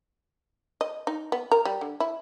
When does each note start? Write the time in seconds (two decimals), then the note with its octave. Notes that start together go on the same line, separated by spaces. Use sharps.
0.81 D#5
1.07 D#4
1.32 B3
1.52 A#4
1.65 G3
1.81 D3
2.00 E4